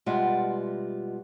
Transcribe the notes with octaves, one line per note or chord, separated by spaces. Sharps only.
B2 G3 G#3 F4 E5 F#5